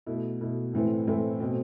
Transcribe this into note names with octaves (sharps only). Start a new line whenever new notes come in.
B2 A3 E4
B2 A3 E4
A2 E3 A3 C4 E4
A2 E3 A3 C4 E4
B2 A3 C4